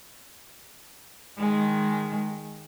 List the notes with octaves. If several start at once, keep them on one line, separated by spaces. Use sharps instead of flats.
D#3 G#3